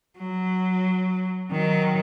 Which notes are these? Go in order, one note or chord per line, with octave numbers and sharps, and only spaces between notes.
F#3
D#3 F#3